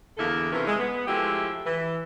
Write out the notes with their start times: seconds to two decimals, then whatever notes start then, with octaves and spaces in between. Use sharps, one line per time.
0.17 E2 D3 A#3 E4 A4
0.52 C3 D#3 E3 C#4 E4 B4
0.67 G#3
0.79 B3
1.07 F3 G#3 A3 E4 F#4 G4
1.65 E3